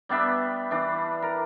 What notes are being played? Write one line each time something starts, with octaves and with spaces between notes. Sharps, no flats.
G3 B3 D4 E5
E3 D4
A#4